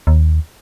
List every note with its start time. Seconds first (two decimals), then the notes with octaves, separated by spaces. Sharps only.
0.07 D#2